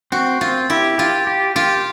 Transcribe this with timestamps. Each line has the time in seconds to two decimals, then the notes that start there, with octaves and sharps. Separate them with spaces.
0.12 C4 F#4
0.41 C4 F4
0.70 E4 G4
0.98 F4 G4
1.27 G4
1.56 F4 G4